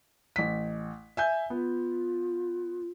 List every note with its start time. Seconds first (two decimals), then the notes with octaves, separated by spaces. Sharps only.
0.36 A1 B6
1.17 E5 G#5 G6
1.50 B3 F4